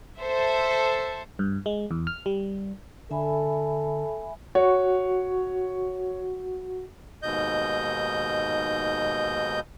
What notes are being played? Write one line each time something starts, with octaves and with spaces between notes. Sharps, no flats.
A4 C5 E5
G2
G#3
E2
F6
G3
D3 A4 E5 G#5 B5
F#4 C#5
D#2 G#2 B2 D#5 G6